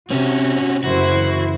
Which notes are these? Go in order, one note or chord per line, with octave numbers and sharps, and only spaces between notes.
C3 C4 C#4 F#4
F#1 E3 E4 F#4 C5